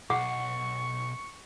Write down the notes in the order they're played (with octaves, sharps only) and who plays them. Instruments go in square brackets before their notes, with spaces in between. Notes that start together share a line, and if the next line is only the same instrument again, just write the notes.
[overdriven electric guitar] B1 [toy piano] F#5 [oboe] C#6 [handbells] D6